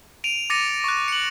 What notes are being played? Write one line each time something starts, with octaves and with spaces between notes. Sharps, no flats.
D7 D#7 F7
D6 A6 A#6 C#7 D#7 F7
C#6 F#6
C#7 F#7